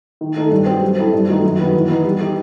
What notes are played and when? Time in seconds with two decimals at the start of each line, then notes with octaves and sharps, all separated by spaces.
0.21 D#3
0.36 A3 D#4 A4
0.51 G2
0.66 F#3 C4
0.82 G3
0.97 C4 E4 A4
1.13 G2
1.28 D#3 F#3 A3 D#4
1.43 F#2
1.59 D#3 F#3 B3
1.74 E3
1.89 B3 D#4
2.05 G3
2.20 D#4 G4